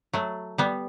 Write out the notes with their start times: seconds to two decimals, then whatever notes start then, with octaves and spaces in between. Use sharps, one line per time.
0.13 F#3 A3
0.58 G3 B3